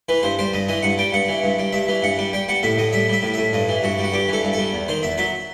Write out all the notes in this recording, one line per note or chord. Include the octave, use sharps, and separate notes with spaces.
E3 B4
G2 C5
G3 C5
G2 D#5
E3 D#5
G2 F#5
G3 G5
G2 F#5
E3
G2
G3
G2 E5
E3
G2 F#5
G3
G3 G5
G3 F#5
A2 E5
A2 D#5
G3 E5
G3 E5
A2
A2 E5
G2 D#5
E3
G2 F#4
G3
F#4
G2 G4
E3 A4
G2
G3 A4
E2
D#3 C5
E2 E5
F#3 E5